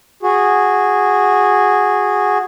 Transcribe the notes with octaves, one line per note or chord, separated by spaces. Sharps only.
F#4 G#4